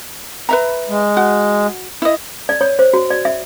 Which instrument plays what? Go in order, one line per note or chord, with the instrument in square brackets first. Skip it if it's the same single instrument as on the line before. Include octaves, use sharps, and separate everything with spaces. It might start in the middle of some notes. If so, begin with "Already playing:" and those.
[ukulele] B4 E5 A#5
[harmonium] G#3
[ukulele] F#4
E4 D#5
[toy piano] D5
C#5
C5
F#4
D5
E5